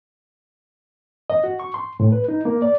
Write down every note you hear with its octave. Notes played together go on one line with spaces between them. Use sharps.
D#5
F#4
C#6
C6
A2
B4
D#4
A#3
D5